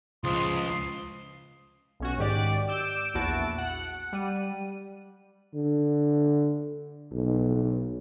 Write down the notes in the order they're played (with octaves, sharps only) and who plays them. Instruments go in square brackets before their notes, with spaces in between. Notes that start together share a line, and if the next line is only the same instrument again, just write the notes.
[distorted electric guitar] C#2 [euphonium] F3 [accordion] C6 [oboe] D#6
[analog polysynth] B1 C#4 F#4
G#2 D#3 G4 D5
D6 E6 G6 D7 E7
A#1 E2 E4 F#4 A5 D7
F#5
G3 D#7
[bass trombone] D3
B1